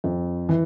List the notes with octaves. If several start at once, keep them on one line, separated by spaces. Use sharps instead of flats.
F2
E3